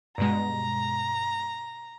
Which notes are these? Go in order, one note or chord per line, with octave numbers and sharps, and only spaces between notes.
G2 B2 G#3 A#5